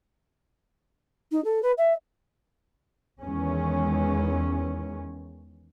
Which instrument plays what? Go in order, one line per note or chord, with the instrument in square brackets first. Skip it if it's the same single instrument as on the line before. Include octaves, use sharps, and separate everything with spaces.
[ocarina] D#4
A4
B4
E5
[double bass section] E2 D#3 E3 G#3 C#4